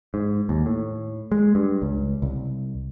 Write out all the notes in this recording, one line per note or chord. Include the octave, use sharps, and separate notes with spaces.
G#2
D#2
A2
G#3
G2
C#2
C2